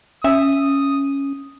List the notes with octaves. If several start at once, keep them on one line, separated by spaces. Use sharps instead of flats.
C#4 E5 D#6